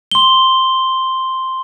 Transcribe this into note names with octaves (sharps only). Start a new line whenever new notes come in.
C6 G7